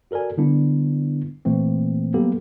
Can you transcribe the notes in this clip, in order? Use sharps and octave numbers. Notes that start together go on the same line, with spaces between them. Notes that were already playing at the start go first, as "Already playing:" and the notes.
F#4 A4 A#4 D5 G#5
D3 G3 B3 D4 E4
A#2 E3 A3 A#3 C4
F#3 G3 A#3 B3 G4 A4